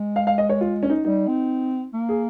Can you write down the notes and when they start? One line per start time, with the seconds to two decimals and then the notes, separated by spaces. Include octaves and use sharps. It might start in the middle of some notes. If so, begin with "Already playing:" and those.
Already playing: G#3
0.16 F5
0.27 F5
0.38 D#5
0.49 C#5
0.61 F4
0.83 C#4
0.90 D#4
1.05 G3 D#4
1.28 C4
1.94 A#3
2.09 G#4